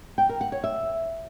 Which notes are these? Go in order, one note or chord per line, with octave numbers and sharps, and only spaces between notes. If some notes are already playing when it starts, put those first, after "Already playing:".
G5
A#4
F#5
C#5
E5